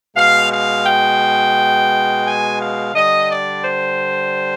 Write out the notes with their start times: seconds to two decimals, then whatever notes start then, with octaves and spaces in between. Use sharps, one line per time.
0.16 B2 G#3 F5
0.51 F5
0.86 G5
2.26 G#5
2.60 F5
2.94 D3 G3 D#5
3.30 D5
3.65 C5